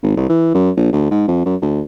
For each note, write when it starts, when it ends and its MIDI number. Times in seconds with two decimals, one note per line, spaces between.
0.03 0.13 32
0.17 0.28 36
0.29 0.52 52
0.54 0.71 42
0.77 0.91 34
0.93 1.09 38
1.11 1.24 44
1.28 1.42 41
1.46 1.56 42
1.62 1.81 38